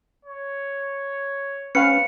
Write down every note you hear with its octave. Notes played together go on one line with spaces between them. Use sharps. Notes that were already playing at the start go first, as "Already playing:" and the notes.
C#5
C#4 B4 F5 C#7